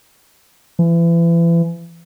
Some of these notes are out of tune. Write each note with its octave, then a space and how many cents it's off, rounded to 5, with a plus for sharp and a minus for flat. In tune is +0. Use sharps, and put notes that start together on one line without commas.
E3 +35